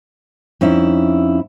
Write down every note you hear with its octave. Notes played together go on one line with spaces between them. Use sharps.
F2 C#4 D#4 E4 E5